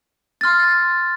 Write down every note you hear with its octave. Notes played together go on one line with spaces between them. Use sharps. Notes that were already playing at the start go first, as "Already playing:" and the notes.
C6 F6 A6